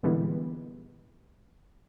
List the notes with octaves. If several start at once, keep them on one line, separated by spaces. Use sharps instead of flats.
A#2 D3 E3 G3 G#3 B3